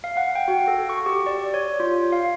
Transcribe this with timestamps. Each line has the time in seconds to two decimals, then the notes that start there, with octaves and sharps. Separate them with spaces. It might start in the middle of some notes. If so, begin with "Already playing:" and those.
0.04 F5
0.17 F#5
0.35 G5
0.48 F#4
0.68 A4
0.89 C#6
1.06 G4
1.26 D5
1.54 C#5
1.80 F4
2.12 F5